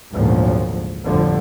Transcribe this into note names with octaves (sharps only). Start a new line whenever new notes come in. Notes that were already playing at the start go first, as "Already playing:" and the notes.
G#1 D2 A#2 C#3 F3 F#3
G1 F2 A2 D3 F3